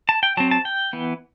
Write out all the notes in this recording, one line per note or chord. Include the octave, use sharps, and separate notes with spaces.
A5
G5
F#3 C4 A5
A5
G5
E3 B3